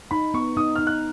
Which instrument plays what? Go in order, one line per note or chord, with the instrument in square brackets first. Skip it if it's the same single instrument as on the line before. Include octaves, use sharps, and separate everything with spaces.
[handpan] D#4 [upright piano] B5
[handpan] B3 [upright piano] C#6
[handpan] D#4 [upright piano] D#6
[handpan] D#4 [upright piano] F6
[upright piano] F#6